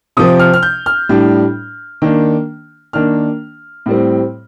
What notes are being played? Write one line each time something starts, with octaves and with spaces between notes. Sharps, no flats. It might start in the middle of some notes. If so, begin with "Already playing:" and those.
C3 F3 C4 D#6
F6
F6
G6
F6
A2 G3 D4
D#3 A#3 D4
D#3 A#3 D4 F6
A2 G3 C4